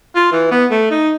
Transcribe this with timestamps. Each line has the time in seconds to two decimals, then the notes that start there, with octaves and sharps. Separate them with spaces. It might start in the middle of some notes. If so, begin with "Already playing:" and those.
0.15 F4
0.32 E3
0.51 B3
0.70 A3
0.91 D#4